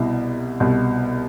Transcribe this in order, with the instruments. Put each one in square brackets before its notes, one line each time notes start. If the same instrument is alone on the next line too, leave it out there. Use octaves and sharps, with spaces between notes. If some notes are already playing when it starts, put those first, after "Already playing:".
Already playing: [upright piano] C2 B2 E4
C2 B2